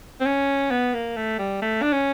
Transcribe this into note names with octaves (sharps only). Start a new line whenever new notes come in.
C4
C#4
B3
A#3
A3
G3
A3
D4
C#4